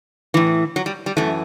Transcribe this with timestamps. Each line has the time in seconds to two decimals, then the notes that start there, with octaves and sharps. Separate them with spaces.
0.34 A2 E3
0.76 F#3
0.86 G3
1.06 G3
1.17 F#2 E3 A3